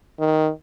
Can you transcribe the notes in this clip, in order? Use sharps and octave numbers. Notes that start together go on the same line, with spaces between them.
D#3